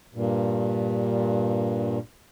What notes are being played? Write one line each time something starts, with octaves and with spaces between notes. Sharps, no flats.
G2 A#2